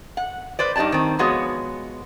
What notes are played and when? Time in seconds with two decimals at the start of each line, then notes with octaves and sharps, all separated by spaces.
0.17 F#5
0.59 B4 C5 D5
0.76 G2 D#4 G4 D5 A5
0.92 D#3 C4
1.19 F3 G#3 B3 F#4 C#5